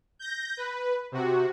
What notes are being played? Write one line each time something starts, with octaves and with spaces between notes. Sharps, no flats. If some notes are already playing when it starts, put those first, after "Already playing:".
G6 A#6
B4
C3 F#4